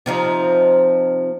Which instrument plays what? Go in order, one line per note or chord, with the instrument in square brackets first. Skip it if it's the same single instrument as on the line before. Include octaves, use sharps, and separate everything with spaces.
[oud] C3 F3 D#4